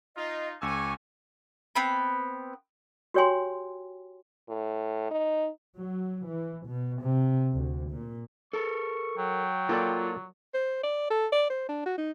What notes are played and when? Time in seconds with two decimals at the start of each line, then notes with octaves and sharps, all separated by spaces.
0.17 D#4 F4 D#5
0.62 C#2 G#5 C#6 D6 E6
1.75 B3 C4 B5
3.14 F#4 G4 C#5 G5 G#5 C6
4.49 A2
5.11 D#4
5.77 F#3
6.27 E3
6.67 B2
7.02 C3
7.54 D2
7.91 A#2
8.53 A4 A#4 C#6
9.18 F#3 G5
9.69 A#3 F4 A4 D5
10.54 C5
10.83 D5
11.10 A4
11.32 D5
11.50 C5
11.69 D4
11.86 F#4
11.98 D#4